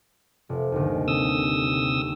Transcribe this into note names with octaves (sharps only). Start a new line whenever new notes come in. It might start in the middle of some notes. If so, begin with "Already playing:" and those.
F1
G1 D#2
C3 D#6 E6